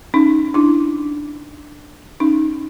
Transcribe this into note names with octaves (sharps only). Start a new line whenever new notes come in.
C#4 D#4
D4 E4
C#4 D#4